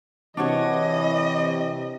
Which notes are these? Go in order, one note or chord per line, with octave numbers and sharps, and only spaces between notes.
C3 E3 D4 F#4 C#5 D#5